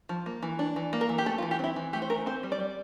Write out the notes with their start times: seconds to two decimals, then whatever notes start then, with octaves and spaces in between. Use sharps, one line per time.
0.09 F3
0.26 A#3
0.43 E3
0.59 D4
0.76 E3
0.93 A#3
1.01 A#4
1.09 E3
1.18 G4
1.26 A3 A4
1.38 F4
1.43 E3
1.51 G4
1.59 C4 E4
1.76 E3
1.93 A3 G4
2.02 C5
2.10 E3 A#4
2.26 C4 C5
2.43 G3
2.52 D5
2.60 G3